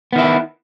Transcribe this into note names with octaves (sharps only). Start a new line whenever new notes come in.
D#3 B3 E4